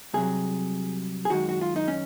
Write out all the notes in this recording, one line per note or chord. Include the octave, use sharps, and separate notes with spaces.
C2 C3 F#3 G#4
G#4
F#2 D#3 G#3 F#4
F#4
F4
D#4
C#4